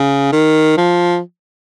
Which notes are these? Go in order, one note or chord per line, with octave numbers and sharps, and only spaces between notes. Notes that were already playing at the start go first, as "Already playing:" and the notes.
Already playing: C#3
D#3
F3